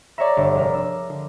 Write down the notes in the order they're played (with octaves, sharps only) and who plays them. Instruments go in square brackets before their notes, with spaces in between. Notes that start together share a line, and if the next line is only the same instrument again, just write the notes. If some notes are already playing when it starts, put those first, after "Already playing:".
[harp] C#5 E5 [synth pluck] D5 A#5
[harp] G1
F1 A#4
E6
[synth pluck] D3